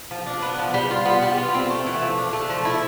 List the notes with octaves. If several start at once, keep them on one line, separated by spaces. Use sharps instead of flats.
F3
D4
B3
F3
G3
F4
B3
G3
F4
C4
A3
E3
F3
D4
A3
F3
E4